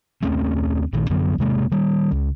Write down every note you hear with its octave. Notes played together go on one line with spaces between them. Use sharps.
D#2 A3 C4 C#4
A#1 D#3
F#2 D3 F#3 B3
E1 C3 G#3 A#3
D#3 G3
C#2